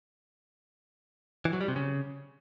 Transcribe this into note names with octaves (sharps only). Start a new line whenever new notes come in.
E3
F#3
G3
C3
C#3